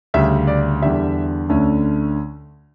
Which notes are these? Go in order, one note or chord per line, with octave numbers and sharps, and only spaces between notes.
D2 C#3 G3 C#4 E5
D5
E2 D3 G3 E5
D2 D3 A3 C#4